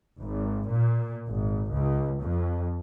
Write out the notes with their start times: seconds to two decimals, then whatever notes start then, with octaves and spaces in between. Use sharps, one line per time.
0.20 G#1
0.70 A#2
1.27 G#1
1.71 C#2
2.21 F2